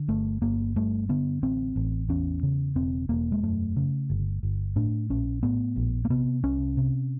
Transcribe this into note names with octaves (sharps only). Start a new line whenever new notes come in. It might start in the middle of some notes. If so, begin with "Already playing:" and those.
Already playing: D3
G1 A3
G1 A#3
G2 A3
D3 B3
A1 C4
A1
E2 C#4
C#3
E1 C4
E1 A#3
G#3
F#2 A3
C#3
G1
G1
A2 D4
A#1 C#4
A2 B3
A#1
A#3
C3 B3
C2 C#4
C3